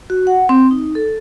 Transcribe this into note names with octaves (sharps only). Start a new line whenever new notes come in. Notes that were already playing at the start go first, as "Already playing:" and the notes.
F#4
F#5
C4
D#4
A4